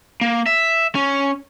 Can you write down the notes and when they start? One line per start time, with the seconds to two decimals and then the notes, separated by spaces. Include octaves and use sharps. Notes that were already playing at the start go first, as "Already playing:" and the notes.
0.21 A#3
0.46 E5
0.95 C#4